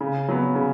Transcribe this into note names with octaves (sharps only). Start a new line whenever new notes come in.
C#3
F#3 B3
C#3